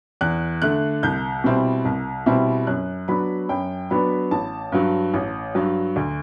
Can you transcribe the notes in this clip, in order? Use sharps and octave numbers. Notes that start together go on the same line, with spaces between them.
E2 F#6
D3 A3 F#6
C2 G6
B2 G3 C4 E4
C2
B2 G3 C4 E4
F#2 F#6
F#3 B3 D4 B5
F#2 G5
F#3 B3 D4 B5
A1 A5
G2 F#3
A1
G2 F#3
D2